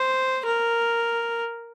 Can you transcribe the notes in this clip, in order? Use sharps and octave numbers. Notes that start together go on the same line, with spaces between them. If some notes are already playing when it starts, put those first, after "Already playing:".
Already playing: C5
A#4